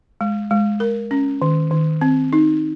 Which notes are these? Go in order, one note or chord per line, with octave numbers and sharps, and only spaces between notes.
G#3
G#3
A#4
C#4
D#3
D#3
C4
D#4